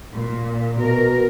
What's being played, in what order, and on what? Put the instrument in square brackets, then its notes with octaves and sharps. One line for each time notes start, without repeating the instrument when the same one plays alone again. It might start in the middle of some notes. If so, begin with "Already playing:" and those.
[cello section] A#2
[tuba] B2 [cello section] A#4